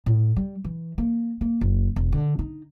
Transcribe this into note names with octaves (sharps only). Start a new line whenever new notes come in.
A2
G3
E3
A#3
A#3
F#1
E1
D3
D#4